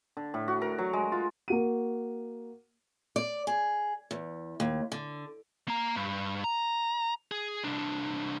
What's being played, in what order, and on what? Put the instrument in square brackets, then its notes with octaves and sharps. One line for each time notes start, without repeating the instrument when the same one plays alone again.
[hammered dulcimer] D3
A2
F#4
A#4
F#3
G#3
F4
[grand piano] A#3 F#4 D#7
[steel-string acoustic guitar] D5
G#4
E2
D#2
D3
[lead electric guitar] A#3 A#5
G2
A#5
G#4
C2 D4